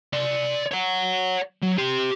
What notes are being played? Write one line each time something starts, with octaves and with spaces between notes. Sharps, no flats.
D5 C6
C#5 F#5
F#3
G4 C6